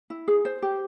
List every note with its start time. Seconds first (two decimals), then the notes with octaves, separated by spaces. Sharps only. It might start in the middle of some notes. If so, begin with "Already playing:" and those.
0.10 E4
0.28 G#4
0.45 C5
0.62 G4